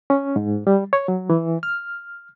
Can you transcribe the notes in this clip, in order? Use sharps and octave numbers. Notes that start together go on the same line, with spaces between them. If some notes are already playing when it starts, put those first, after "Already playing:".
C#4
G#2
G3
C#5
F#3
E3
F6